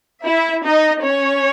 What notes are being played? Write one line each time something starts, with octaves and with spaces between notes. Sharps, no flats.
E4 E5
D#4 D#5
C#4 C#5